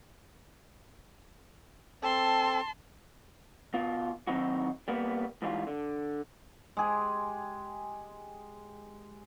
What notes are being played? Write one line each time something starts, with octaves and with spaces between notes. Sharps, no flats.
C4 A4 A5 C6
B2 F4
D#3 F#3 C4 D#4 E4 F#4
G3 A#3 B3
G#2 E3 G3 F4
D3
G#3 G4 G#4